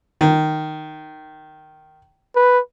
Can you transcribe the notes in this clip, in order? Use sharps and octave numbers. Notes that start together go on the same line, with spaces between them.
D#3
B4